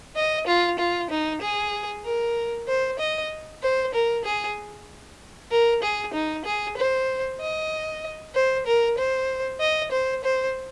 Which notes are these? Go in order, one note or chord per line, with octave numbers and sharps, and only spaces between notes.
D#5
F4
F4
D#4
G#4
A#4
C5
D#5
C5
A#4
G#4
A#4
G#4
D#4
G#4
C5
D#5
C5
A#4
C5
D#5
C5
C5